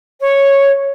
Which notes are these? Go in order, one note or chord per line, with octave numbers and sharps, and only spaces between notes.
C#5